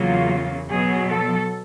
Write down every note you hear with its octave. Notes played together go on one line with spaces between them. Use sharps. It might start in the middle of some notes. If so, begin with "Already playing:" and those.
Already playing: E2 C#3 F#3 A#3 F4
B2 F#3 B3 G#4
A4